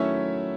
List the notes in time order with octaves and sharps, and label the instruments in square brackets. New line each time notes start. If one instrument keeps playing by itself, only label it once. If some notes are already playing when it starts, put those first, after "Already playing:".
Already playing: [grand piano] D#3 F#3 A3 C#4 E4 C#5 E5